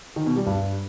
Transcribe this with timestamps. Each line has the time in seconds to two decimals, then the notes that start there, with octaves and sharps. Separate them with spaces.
0.16 D#3
0.26 B2
0.36 G3
0.46 G2